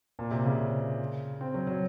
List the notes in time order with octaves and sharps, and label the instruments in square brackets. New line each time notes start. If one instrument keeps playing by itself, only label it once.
[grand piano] A#2
C3
C#3
C4
F#3
F#3